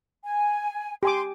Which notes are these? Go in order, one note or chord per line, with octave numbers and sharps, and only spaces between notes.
G#5
G4 G#5 C6 D6